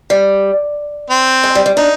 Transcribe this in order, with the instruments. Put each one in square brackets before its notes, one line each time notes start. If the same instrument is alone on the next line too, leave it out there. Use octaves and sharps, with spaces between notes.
[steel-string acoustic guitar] G3
[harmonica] C4
[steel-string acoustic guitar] G#3
G3
G3
[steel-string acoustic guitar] D4 [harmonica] D#4